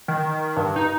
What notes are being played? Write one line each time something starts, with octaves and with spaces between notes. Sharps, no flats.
D#3
G2
D#4